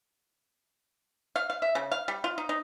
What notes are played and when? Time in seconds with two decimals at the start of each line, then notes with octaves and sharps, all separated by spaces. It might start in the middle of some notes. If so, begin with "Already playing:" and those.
1.36 F5
1.50 F5
1.62 E5
1.75 C#3
1.92 F5
2.08 G3
2.24 F4
2.38 D#4
2.49 D#4